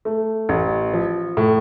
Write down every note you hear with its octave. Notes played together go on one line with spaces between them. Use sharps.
A3
A1
F3
A2